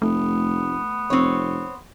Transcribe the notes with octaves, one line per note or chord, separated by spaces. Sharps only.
F1 A3 B3
F1 C4 C#5